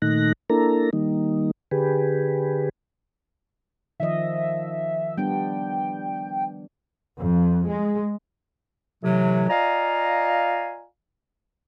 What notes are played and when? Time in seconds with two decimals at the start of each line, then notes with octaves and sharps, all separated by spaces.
0.02 A#2 D#3 A3 D#4 F#6 A#6
0.50 A#3 D4 E4 A4 A#4 A#5
0.93 D#3 G3 A#3 D#4
1.71 D3 G4 G#4 B4
4.00 D#3 F3 D#5 E5
5.17 G3 B3 D4 G5
7.21 F2
7.67 G#3
9.03 A2 C3 E3 F#3
9.49 F4 D5 D#5 F5 G#5 A#5